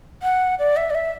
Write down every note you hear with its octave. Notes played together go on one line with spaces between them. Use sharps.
F#5
D5
E5
D5
E5